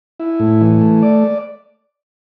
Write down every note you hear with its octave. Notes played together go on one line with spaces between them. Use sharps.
E4
A2
E3
A3
D5